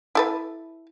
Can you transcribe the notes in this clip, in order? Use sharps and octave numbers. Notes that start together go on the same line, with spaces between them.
E4 A4 B4